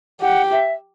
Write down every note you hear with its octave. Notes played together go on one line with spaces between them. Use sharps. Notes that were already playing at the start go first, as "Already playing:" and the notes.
G4 F#5
E5